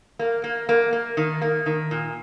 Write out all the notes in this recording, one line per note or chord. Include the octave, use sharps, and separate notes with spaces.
A#3
A#3
A#3
A#3
D#3
A#3
D#3
A#2